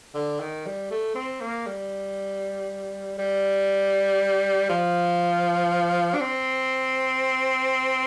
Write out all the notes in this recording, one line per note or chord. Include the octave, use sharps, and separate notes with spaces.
D3
D#3
G3
A3
C4
A#3
G3
G3
F3
D4
C4